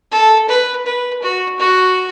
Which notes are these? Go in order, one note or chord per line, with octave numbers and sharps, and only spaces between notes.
A4
B4
B4
F#4
F#4